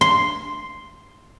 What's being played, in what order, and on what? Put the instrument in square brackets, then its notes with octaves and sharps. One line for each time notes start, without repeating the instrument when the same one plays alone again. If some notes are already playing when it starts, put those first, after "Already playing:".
[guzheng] C6